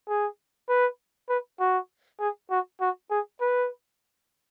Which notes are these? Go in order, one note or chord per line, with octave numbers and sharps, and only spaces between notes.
G#4
B4
B4
F#4
G#4
F#4
F#4
G#4
B4